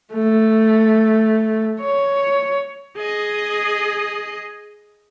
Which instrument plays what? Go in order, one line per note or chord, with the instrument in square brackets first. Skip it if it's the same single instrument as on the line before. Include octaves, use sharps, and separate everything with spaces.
[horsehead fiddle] A3
C#5
[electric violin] G#4 D#5